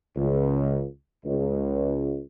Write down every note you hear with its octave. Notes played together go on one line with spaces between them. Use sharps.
C#2
C#2